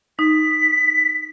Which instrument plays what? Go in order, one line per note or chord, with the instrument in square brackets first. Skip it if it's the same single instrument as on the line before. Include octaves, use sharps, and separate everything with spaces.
[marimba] D#4 [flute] B6